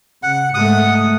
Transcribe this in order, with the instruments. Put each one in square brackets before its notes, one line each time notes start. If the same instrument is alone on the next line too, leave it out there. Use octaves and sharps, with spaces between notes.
[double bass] C#3 [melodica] F#5
[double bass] G#2 A3 [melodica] F#5 D#6